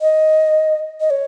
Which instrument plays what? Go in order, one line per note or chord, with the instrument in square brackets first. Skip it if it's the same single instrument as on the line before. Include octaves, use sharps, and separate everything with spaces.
[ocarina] D#5
D#5
C#5